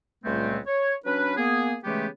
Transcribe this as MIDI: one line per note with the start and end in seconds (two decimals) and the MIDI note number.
0.23 0.57 37
0.23 0.57 46
0.23 0.57 55
0.23 0.57 57
0.23 0.57 59
0.23 0.57 60
0.66 0.94 73
1.05 1.35 54
1.05 1.35 61
1.05 1.35 62
1.05 1.35 71
1.36 1.74 58
1.36 1.74 59
1.36 1.74 68
1.84 2.06 49
1.84 2.06 52
1.84 2.06 56
1.84 2.06 57
1.84 2.06 59
1.84 2.06 67